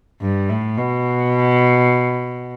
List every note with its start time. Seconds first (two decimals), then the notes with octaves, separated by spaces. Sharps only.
0.22 G2
0.49 A2
0.78 B2